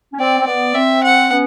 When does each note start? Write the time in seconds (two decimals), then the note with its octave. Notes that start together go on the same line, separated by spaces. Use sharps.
0.13 C#4
0.19 C4 D5
0.39 C4
0.47 B3 D5
0.74 C4 E5
1.03 F#5
1.31 B3 C#4